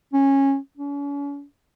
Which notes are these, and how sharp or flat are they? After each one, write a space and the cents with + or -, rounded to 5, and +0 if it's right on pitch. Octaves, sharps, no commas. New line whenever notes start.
C#4 -15
C#4 +40